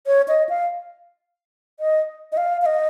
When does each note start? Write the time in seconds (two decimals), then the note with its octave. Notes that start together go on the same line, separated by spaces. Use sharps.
0.07 C#5
0.28 D#5
0.49 F5
1.80 D#5
2.32 D#5
2.37 F5
2.62 F5
2.66 D#5